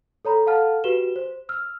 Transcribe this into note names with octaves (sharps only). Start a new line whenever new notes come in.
A4 C#5 A#5 B5
A4 F5 F#5 A5 F6
F#4 G4 B4 E7 G7
C5
E6 F6